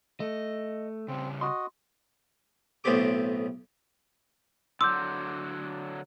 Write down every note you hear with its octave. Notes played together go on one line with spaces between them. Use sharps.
A3 D#5
C#3 G3 C4
F#4 D#5 C6
B1 A2 B3 C4 G4 D6
D3 F#3 C6 D6 E6 G6